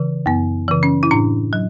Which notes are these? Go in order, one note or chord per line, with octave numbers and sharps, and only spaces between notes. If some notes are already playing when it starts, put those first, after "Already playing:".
Already playing: C#3 E3
F#2 B3
C#3 E3
C#4
E4
A2 D4
F#3